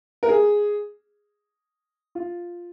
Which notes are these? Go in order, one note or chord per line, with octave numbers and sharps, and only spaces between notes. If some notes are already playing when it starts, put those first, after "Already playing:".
A#4
G#4
F4